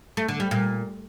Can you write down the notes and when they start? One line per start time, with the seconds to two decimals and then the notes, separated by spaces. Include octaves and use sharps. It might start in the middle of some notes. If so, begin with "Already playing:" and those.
0.17 A3
0.28 D3
0.40 G3
0.51 A#2